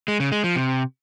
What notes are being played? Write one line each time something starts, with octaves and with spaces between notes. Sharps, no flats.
G#3
C#3
G#3
F3
C3